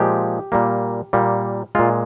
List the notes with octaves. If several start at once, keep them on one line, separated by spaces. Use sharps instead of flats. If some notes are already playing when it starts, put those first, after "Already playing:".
Already playing: A#2 F3 G#3 G4
A#2 G3 A#3
A#2 G3 A#3
A#2 G#3 F4